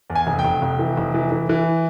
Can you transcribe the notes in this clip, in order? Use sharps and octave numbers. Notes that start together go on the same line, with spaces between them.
E2
G#5
F1
G5
F1
F1
E3
F1
E3
E3
E3